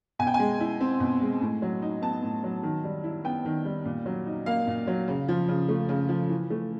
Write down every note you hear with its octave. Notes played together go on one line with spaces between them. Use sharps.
B2 G#5
G5
G#5
G#3
E4
C4
B2
G#3
A2
F#3
D#4
B3 A5
A2
F#3
D#3
G3
E4
B3 G5
D#3
G3
A#2
F#3
D#4
A#3 F5
A#2
F#3
C#3
F3
C#3
A3
C#3
F3
E3
A3